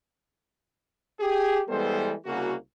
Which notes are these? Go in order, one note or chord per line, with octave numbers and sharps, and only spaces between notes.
G4 G#4
E3 G3 G#3 B3 A4 C5
C2 C#3 A#3 F#4